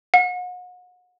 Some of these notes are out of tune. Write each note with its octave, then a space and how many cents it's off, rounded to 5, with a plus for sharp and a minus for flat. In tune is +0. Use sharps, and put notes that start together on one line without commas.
F#5 -40